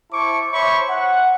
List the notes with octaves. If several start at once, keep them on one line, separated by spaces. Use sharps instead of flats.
E4 C5 A5 C#6 D6
C5 C#5 E5 B5 C#6
F#5